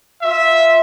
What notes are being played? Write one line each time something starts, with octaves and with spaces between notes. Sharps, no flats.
F4 E5